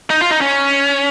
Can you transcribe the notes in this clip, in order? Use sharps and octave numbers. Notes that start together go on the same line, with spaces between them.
D#4
F4
D#4
C#4